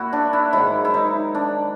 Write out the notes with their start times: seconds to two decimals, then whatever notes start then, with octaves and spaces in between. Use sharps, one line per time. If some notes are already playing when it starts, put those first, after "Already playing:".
Already playing: A#2 E4 F#4
0.13 D4
0.33 E4
0.53 G#2 D#3 F#3 E4
0.85 E4
0.94 D#4
1.35 D4